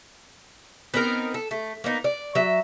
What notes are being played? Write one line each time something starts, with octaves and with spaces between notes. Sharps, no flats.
B3 C4 D#4 A#4
A4
A3
A#3 B3 D#4
D5
F#3 E5